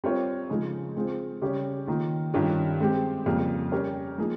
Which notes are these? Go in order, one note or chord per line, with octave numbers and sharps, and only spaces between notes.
G3 C4 F4 A#4 C#5
C#3 F3 G#3 D#4 G#4
G#3 C4 F4 G#4 C5
C#3 G3 C#4 G4 C#5
D#3 A#3 F4
G2 D#3 G3 C#4 F4
G#3 C4 G4
F2 C#3 G3 A#3
G3 C#4 G4 A#4 C#5
F3 A#3 D#4 G#4